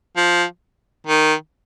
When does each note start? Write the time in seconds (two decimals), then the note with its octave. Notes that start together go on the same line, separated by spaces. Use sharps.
0.17 F3
1.07 D#3